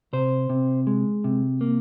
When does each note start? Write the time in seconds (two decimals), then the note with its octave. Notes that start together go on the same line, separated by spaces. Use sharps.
0.13 C3 C5
0.50 C3
0.87 G#3
1.24 C3
1.61 A#3